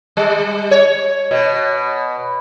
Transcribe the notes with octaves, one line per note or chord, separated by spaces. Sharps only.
G3
C#5
B2